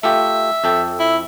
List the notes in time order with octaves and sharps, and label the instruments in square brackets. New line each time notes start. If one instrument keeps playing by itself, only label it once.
[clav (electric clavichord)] A3 F4 G4 [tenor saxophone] E5
[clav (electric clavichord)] F2 A4 G5
[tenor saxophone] E4